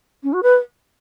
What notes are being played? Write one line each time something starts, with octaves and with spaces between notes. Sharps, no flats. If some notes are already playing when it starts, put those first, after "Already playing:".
C#4
F#4
B4